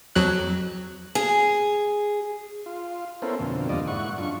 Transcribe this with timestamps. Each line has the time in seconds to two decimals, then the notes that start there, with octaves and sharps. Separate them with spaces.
0.16 F2 F#3 F#6
1.15 G#4
2.66 F4
3.22 B3 C#4 E4 A4 A#4 C5
3.39 F2 B2 D3 A#3 C4
3.69 E2 D3 G3 F4 D5 D#5
3.88 G#2 E4 F#5 C#6
4.18 F#2 D4 F4 C#6